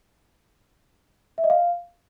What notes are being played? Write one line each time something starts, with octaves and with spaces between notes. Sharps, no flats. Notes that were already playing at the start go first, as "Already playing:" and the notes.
E5
D#5
F5